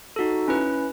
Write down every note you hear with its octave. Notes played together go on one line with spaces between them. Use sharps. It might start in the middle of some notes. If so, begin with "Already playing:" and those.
D#4 F#4 A4
C#4 E4 B4